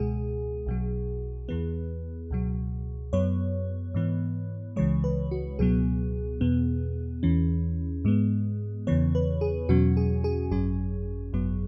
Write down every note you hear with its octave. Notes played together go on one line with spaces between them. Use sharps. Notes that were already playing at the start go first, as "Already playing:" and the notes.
Already playing: C#2 B2 G#3 G#4
B1 B2 F#3
E2 E3 B3
C#2 B2 F#3
F#2 F#3 B3 C#5
G#2 E3 B3
C#2 C#3 E3 G#3 C#5
B4
F#4
C#2 B2 F#3 B3 G#4
E2 B2 B3
E2 E3 C#4
G#2 G#3 B3
E2 C#3 E3 B3 C#5
B4
G#4
E2 B2 F#3 C#4 F#4
G#4
G#4
G#1 F#2 F#3 C#4 G#4
G#1 F#2 F#3 B3